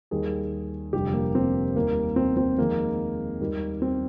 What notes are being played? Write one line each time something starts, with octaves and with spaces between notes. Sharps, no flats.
D#2 D#3 G3 G#4
F1 F2 D3 G3 G4
A#3
C4
D#2 D#3 G3 A#3
C4
C4
F2 D#3 G#3 A#3
D#2 D#3 G3
C4